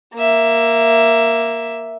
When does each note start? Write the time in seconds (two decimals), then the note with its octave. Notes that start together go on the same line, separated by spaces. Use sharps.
0.14 A#3 E5